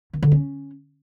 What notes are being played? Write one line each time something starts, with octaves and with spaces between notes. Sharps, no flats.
D#3
D3
C#4